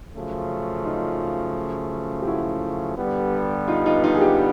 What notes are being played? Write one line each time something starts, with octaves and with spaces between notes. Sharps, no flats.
F#2 C#3 F3 A3
D#4 F4
G4
E4 F#4
G2 D3 G3 B3
D#4 F4
D#4 F4
D#4 F4
G#4
F4 G4